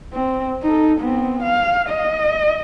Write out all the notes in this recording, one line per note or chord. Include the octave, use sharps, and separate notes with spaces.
C4
D#4 A4
B3 C4
F5
D#5